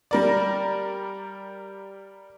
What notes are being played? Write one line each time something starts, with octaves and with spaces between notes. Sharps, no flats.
G3 A#4 D5